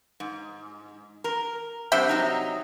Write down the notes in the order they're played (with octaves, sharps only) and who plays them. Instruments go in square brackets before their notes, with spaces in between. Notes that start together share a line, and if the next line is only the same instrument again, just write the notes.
[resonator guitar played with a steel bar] G#2
A#4
[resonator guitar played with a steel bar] G2 F#5 [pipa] C3 E5 G5
[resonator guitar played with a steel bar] F#3 D#4